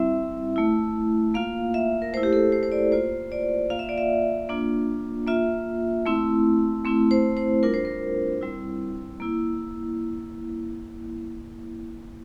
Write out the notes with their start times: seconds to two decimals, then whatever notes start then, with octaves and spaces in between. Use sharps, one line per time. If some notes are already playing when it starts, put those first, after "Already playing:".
Already playing: G3 C4 E4 E5
0.56 A3 E4
1.34 A#3 F4 F5
1.74 E5
2.02 A#4
2.13 A3 C5
2.17 E4
2.23 G4
2.33 A4
2.52 C5
2.63 C5
2.72 D5
2.91 A#3 F4 C5
3.32 D5
3.70 A#3 F4 F5
3.79 E5
3.89 D5
3.98 E5
4.49 A#3 D4 F4
5.27 A#3 F4 E5
6.06 A3 C4 E4
6.85 A3 C4 E4
7.11 C5
7.37 C5
7.63 G3 D4 F4 A#4
7.74 C5
7.85 A#4
8.41 G3 C4 E4
9.20 A#3 E4